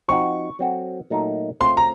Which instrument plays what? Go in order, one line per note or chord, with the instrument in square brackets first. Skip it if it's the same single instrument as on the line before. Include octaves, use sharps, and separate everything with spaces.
[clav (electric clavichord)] F3 C4 D#4 F#4 [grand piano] C#6
[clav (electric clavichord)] F#3 C4 F#4 A4
A#2 F#3 A3 D#4 A#4
[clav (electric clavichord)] C#3 A3 C4 F4 C5 [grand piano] C6
[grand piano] A#5